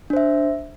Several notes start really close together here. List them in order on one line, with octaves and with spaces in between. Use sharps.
D4 C5 E5